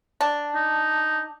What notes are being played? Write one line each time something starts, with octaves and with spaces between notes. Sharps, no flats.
D4
D#4